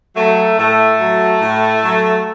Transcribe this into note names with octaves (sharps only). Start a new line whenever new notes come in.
F#3 A3
A2 A3
F#3
A2
F#3